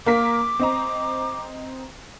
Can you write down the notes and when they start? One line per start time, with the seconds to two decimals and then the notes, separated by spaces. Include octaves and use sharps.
0.06 A#3 A#4 D6 B6
0.59 C4 D#5 A#5